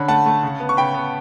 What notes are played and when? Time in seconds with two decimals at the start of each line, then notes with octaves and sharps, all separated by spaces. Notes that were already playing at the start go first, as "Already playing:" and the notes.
Already playing: D3 C#4 B5
0.08 A3 F#5 A5
0.26 A3
0.43 C#3
0.60 B3
0.69 C#6
0.77 C#3 G5 B5
0.94 B3